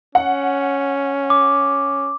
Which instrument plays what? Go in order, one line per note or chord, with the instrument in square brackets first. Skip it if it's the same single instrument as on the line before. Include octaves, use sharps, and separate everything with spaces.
[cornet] C#4 [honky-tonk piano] F#5
[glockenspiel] D6